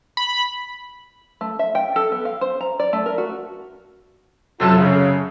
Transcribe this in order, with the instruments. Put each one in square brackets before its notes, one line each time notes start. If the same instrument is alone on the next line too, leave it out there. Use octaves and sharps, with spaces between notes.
[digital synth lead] B5
[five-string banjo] A3
E5
G5
A4
B3
F5
C5
A#5
D5
A3
A#4
F#4
[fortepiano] F#2 C3 F#3 [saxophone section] F4 A4
[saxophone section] C#3